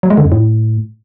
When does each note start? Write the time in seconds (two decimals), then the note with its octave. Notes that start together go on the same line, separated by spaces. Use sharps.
0.03 F#3
0.10 G#3
0.17 D3
0.25 F2
0.32 A2